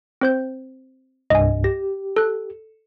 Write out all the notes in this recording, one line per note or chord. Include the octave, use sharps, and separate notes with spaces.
C4 C5 G6
C2 G2 D#5 G#5
G4 A#6
A4 F#6